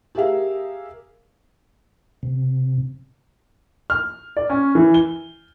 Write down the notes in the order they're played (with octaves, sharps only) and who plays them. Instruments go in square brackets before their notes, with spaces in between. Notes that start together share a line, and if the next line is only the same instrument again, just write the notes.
[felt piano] G4 G#4 A#4 E5 F5
[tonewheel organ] C3
[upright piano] F6
D5
C#4
E3
G7